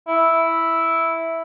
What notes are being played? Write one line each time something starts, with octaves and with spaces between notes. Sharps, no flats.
E4